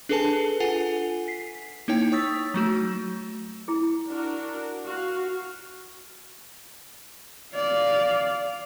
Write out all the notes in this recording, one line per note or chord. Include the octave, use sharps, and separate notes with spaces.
D4 G#4 A4 B4 G#5 A5
F4 A4 F#5 G#5 C7 F7
B6 C7
A#3 D#4 E4 C#5 G5
C#5 C#6 D#6 E6 A6 B6
F#3 A3 F#4
E4 G#4
D4 F#4 A#4
F#4 F5
D5 F5